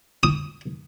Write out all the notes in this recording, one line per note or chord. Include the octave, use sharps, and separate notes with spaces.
D#6